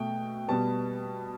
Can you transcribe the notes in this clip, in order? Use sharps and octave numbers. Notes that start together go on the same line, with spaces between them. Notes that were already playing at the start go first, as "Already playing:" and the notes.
Already playing: B2 A3 G5
B2 G3 B3 A5